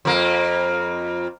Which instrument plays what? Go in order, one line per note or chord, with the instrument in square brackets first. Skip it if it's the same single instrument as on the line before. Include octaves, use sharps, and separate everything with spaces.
[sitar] F2 A#3